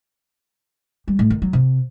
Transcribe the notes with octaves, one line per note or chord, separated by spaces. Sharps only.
G3
A2
D#3
F#3
C3